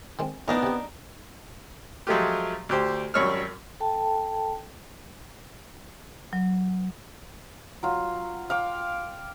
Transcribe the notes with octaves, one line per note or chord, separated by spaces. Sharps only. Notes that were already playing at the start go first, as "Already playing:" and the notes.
D#3 G#3 C4
A2 E3 B3 D4 D#4 A#4
C3 G4
F3 F#3 G#3 A3 F4 G4
D2 G4 C5
G#1 F#2 G3 C#5 E6 F6
A4 G5 A5
F#3
F#3 F4
F5 G5 D6